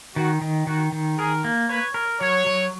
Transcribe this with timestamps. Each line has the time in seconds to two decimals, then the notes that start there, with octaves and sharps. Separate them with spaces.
0.15 D#3 F#4
0.41 D#3
0.67 D#3 F#4
0.92 D#3
1.18 G#4 A#4
1.44 A#3
1.69 B4 C#5
1.94 A#4
2.21 F#3 C#5
2.46 F#3